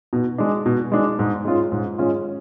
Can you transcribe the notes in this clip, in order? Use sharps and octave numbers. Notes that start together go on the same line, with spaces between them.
B2
G#3 D4
B2
G#3 D4
G#2
G#3 C#4 F4
G#2
G#3 C#4 F4